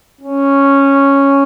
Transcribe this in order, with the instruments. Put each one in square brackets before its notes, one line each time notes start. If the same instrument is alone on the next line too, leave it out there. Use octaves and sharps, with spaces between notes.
[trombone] C#4